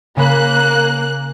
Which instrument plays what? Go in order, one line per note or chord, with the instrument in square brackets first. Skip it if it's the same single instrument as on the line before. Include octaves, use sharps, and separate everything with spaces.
[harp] C#3 B5 [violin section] A#3 F#6